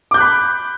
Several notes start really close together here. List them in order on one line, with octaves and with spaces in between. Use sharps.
D6 G6 F#6 B5